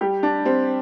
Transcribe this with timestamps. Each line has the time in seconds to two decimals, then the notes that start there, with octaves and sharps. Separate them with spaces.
0.01 G3 G4
0.23 D4
0.45 G3 C4